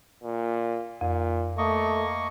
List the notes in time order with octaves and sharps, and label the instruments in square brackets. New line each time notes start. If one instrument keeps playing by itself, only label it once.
[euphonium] A#2
[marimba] F2 [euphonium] A#2
[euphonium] A3 [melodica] A#3 D#5 C#6